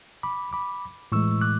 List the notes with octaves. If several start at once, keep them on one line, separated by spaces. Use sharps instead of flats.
B5 D6
B5 D6
A2 E3 G#3 C#6 E6
D6 F#6